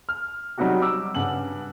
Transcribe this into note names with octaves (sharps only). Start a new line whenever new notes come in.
F6
F#3 G3 C4 D#4 F#4 G4
D6 E6
G2 C#3 F#5 F#7